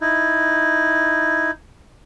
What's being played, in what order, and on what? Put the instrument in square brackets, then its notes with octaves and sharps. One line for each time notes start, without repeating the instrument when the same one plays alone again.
[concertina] D#4 E4